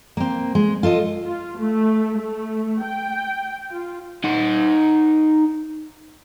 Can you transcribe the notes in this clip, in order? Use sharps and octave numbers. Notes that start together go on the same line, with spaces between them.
A#3 C4
G#3
F4 A4 A#4 D#5
F4
A3
A3
G5
F4
D#4 F#5